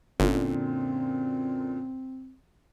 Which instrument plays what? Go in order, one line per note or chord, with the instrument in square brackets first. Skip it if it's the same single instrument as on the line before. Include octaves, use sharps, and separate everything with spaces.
[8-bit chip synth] G1 [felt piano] F#2 A#2 D3 [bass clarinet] C4